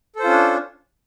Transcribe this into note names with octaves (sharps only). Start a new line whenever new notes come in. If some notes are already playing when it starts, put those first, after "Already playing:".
C#4 D4 F4 A4 C5